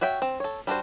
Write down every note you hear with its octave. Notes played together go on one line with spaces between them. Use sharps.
F#4 C#5 E5 G5
C4
A4 C#5
G3 D4 F#4 C5